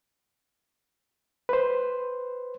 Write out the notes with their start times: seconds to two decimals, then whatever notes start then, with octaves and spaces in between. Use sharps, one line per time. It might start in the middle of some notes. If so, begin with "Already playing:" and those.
1.49 B4 C5